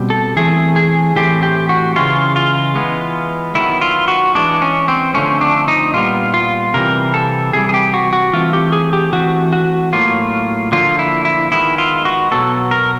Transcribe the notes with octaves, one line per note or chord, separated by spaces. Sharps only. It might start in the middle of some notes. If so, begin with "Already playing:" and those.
Already playing: B2 G3 C4
A4
E3 A3 C4 G#4
G#4
A2 E3 A3 C4 G4
G4
F#4
C#3 E3 G#3 F4
F4
E3 G#3 B3
D#3 F#3 B3 E4
F4
F#4
E3 G#3 B3 D4
C#4
C4
D3 F3 A3 C4 C#4
D4
D#4
A#2 G3 B3 F4
F4
C3 E3 G3 C4 A#4
A4
C3 E3 G3 G#4
G#4
G4
F#4
F#4
E3 A3 C4 F4
G4
G#4
G4
E3 A3 C4 F#4
F#4
A2 F#3 A#3 F4
D3 F3 A#3 F4
E4
E4
D#3 G#3 B3 E4
F4
F#4
B2 F#3 B3 A4
A#4